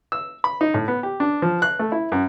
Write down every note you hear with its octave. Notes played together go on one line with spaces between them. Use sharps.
E6
B5
D#4
A2
B3
G4
D4
F3
F#6
A3
E4
F#2